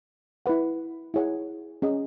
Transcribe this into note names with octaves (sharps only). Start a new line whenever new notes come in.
E4 B4 F#5
E4 G#4 C#5 F#5
C#4 G#4 D#5 F#5